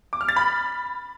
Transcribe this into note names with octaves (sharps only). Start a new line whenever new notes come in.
D6
F6
A6
B5